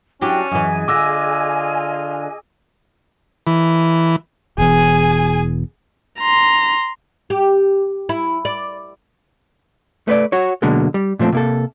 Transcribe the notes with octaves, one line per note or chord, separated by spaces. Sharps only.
F#3 C#4 D4 E4 F#4 G4
F#2 E3 G#4 D#5 G#5
D3 F4 E5 D6 E6 A#6
E3
E1 E2 G#4 G#5
A#5 C6
G4
E4
D5
A3 B4 C5 D5
F#4 C#5
B2 D3 F#3 G#3 A#3
G3
A#2 F3 A3 C4
C3 A#3 A4